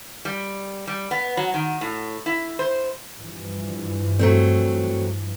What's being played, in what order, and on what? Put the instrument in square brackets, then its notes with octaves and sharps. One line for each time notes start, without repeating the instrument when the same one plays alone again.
[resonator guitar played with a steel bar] G3
G3
B3
F#3
D#3
A2
E4
C5
[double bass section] G2 E3 F3
[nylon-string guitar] F#3 A3 C4